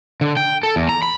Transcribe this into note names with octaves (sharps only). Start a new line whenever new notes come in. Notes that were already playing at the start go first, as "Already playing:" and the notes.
D3
G5
A4
E2
A#5
B5